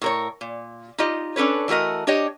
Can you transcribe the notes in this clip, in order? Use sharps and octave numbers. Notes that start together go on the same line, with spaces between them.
A2 A#4 C#5
A#2
D#4 F4 G4 D#5
C#4 D4 A4 B4 C#5
E3 A3 F#4 A#4 D#5
D4 G4 C#5 D#5